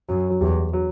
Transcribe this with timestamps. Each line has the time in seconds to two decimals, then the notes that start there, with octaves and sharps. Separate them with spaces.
0.09 F#2 F#3
0.30 F#3
0.41 E2 G3
0.73 F#3